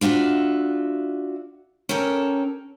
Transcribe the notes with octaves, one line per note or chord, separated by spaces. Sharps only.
D4 F4 F#4 C5 E5
C#4 G4 A4 A#4